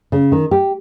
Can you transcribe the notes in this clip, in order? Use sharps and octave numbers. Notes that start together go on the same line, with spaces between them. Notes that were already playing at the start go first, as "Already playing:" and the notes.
C#3
D#3
G4